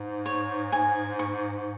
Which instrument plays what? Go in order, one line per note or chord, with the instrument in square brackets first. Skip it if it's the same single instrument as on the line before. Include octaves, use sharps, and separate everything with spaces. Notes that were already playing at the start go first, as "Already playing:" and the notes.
Already playing: [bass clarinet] G#2
[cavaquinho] C#5
G#5
C#6